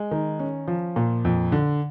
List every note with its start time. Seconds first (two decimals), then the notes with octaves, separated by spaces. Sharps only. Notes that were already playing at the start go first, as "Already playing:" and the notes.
Already playing: G#3
0.11 D#3
0.39 C#4
0.68 F3
0.96 A#2
1.25 F2
1.52 D3